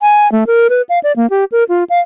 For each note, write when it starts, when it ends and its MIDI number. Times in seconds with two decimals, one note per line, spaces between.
0.02 0.30 80
0.32 0.44 57
0.47 0.68 70
0.70 0.82 71
0.89 0.99 77
1.03 1.12 74
1.16 1.29 58
1.30 1.45 67
1.52 1.64 70
1.69 1.84 65
1.90 2.00 77